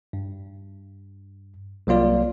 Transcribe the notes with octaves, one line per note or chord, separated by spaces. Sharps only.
G2
C2 F#3 A#3 F4 D5